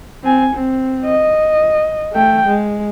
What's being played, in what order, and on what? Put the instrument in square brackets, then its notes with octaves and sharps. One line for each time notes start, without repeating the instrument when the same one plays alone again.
[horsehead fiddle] C4 G#5
C4
D#5
A3 G5
G#3